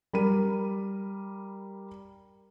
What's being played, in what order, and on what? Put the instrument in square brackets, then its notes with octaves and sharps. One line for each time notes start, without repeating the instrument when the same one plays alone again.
[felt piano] G3 A#4 B5 D#7